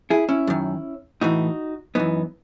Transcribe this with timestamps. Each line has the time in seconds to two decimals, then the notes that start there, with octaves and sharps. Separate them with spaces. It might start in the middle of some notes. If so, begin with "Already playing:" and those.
0.10 E4 G#4
0.29 C#4 E4
0.47 F#2 D#3
1.21 A2 E3 D#4 F#4
1.95 F#2 E3 B3 D#4